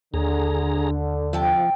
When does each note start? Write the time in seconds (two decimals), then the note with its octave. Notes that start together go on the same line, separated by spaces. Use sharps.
0.14 D#2 D3 G#4 A#5
1.33 C3 F3 G5 A5